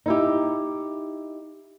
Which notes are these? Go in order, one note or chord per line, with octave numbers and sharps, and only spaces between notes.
D#4 E4 G4